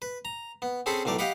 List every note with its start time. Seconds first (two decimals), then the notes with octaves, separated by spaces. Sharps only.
0.02 B4
0.25 A#5
0.62 B3
0.86 C4 C#4 G#4 A4 B5
1.05 B1 A2 A3 A#4 D5
1.18 G4 D#5 F5 F#5 B5 D6